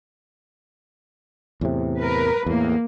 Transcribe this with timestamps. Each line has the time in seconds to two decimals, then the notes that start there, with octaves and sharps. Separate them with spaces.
1.61 E2 A2 C3
1.99 A#4 B4
2.46 E2 A2 A#3